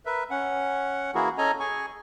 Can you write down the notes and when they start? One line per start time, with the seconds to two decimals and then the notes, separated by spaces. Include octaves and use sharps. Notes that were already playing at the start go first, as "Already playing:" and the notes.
0.06 A#4 B4 E5
0.30 C#4 F#5
1.15 E3 A#3 E4 F#4 G#4 A#4
1.38 C#4 A4 D#5 G#5 A#5
1.60 G#4 G#5 C#6